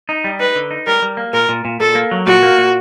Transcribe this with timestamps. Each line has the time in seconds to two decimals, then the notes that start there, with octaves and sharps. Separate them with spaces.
0.09 D#4
0.24 G3
0.40 D#4 B4
0.56 D3
0.71 D#4
0.87 G3 A#4
1.02 G3
1.17 A#3
1.33 A#2 A#4
1.49 A#2
1.65 A#2
1.80 A#2 A4
1.95 A#3
2.11 F#3
2.26 A#2 F#4
2.43 A#3
2.58 A#2